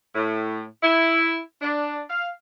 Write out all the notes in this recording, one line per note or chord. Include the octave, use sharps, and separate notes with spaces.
A2
E4
D4
F5